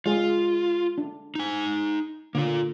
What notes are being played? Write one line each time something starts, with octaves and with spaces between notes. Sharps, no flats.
G#3 F4 G#4
D4
D#4 G#5
D3 A#3 F4